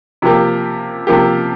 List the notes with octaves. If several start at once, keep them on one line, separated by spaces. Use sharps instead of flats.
C3 F3 A#3 G4
C3 F3 A#3 G4